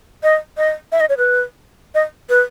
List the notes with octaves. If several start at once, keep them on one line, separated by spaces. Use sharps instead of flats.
D#5
D#5
E5
D#5
C#5
B4
D#5
B4